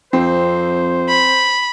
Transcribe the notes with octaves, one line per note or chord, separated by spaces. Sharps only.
F2 C4 C5
B5